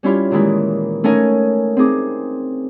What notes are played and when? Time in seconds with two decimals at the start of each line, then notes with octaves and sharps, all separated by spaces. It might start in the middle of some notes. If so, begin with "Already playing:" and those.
0.03 G3 C#4 E4 F4 G4
0.31 A#2 D#3 E3 G#3 E4
1.04 A3 C#4 D#4 A#4 G#5
1.77 C4 D#4 G#4 D6